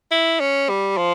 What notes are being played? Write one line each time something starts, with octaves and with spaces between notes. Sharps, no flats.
E4
C#4
G3
F3